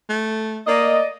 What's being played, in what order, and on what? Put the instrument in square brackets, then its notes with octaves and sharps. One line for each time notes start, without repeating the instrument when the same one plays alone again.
[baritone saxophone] A3
[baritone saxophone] A#3 [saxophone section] D5 D#5